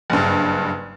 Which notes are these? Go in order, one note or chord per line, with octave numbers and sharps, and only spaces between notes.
F#1 G2